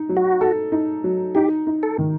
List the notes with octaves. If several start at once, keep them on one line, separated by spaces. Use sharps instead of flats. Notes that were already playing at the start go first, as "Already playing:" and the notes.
Already playing: D#4
F#3
F#4
A4
D#4
F#3
D#4 G4
D#4
A4
D#3